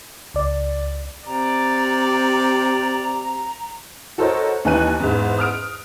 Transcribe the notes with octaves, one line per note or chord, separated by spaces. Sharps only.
C#2 D5
C3 D5 A#5
F#4 A4 A#4 C5 C#5 D#5
D#2 E3 D#4 G#5 F#6 D#7
E2 G#2
D#6 F6 D7